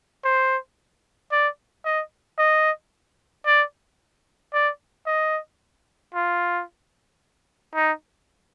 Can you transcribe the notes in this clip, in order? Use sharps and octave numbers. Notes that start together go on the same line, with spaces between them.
C5
D5
D#5
D#5
D5
D5
D#5
F4
D#4